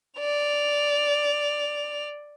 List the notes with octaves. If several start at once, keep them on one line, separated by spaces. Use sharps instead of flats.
D5 F7